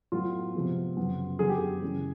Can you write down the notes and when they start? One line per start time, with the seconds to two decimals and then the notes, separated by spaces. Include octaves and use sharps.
0.12 A2 F#3 B3 F4
0.54 C3 F3 G#3 B3
0.97 F#2 C#3 F#3 B3
1.39 F#2 D3 F#3 B3 G#4
1.49 G4
1.58 G#4
1.82 F#2 C#3 E3 G#3